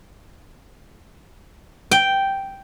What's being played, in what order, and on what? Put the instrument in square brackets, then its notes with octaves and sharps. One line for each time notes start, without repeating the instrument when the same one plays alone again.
[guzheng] G5